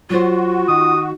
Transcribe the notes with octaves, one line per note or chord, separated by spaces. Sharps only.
F#3 F4 F#4 C5
D#3 D#6